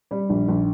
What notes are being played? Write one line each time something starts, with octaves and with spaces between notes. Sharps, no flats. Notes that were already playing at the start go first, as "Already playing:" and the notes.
G3 D5
A#1
A#1